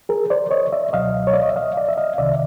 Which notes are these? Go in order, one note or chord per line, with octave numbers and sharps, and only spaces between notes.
G#4 A#4
C5 D5
C#5 D#5
D5 E5
C#2 B2 F#3 D#5 F5
C#5
D5
D#5
E5
D#5 F5
D5 E5
E5
D#5 F5
C2 C3 D#3 D5 E5